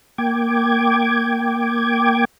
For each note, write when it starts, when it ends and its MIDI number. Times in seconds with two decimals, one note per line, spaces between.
0.18 2.25 58
0.18 2.25 79
0.18 2.25 86
0.18 2.25 92